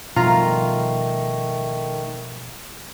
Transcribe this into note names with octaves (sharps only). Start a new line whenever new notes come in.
B2 D#3 F3 G3 A3 F4 A#5